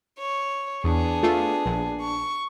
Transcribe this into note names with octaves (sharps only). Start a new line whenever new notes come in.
C#5
E2 B3 D4 G#4
A3 F4
A#1
C#6